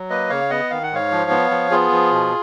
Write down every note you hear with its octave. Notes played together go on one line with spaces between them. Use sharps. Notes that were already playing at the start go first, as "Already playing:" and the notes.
Already playing: F#3
A#3 B4 D#5
C#3 C#5 F5
B3 D#5 F#5
D#3 F5
F#5
G#2 C#5 F5
F3
B3
F3
B3 F4 G#4
F3
B2